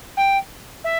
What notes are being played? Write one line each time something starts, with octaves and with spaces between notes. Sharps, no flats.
G5
E5